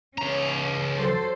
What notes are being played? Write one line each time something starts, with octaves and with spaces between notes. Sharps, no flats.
C#2 C#4 A#5
F#3 A4 C5